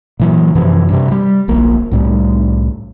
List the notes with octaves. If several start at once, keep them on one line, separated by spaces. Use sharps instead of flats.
A#2 E3 F#3
F#2 C3 E3 F3
G2 C3
G3
D1 A#1 A#3
C2 A2 G3